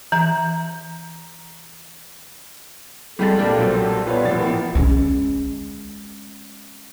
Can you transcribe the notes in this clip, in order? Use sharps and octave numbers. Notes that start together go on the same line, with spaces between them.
E3 A#5
C2 G3 G#3 G4 A4 A6
A#2 A#3 D4 A4
B1 F#3 C5
A#2 G3 B3 F4 B4 C#5
A1 F3 A6
A#3 B3 E4
G#3 C#4